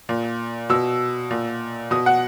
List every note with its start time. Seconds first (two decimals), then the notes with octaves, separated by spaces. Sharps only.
0.09 A#2
0.70 B2 E6
1.30 A#2
1.91 B2 D#6
2.06 F#5